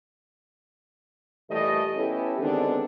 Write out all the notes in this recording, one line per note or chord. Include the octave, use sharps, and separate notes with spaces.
A#2 E3 G3 A3 G4 D#5
B3 C#4 E4 G4 A4
D3 D#3 G#3 B3 C4 D4